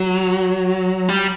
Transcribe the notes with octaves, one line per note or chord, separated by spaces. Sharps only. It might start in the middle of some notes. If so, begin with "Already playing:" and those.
Already playing: F#3
G3